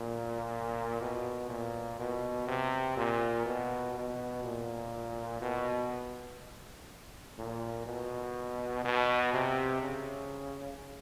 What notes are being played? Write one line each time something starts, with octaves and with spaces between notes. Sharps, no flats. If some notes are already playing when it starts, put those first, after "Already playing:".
Already playing: A#2
B2
A#2
B2
C3
A#2
B2
B2
A#2
B2
A#2
B2
B2
C3
C#3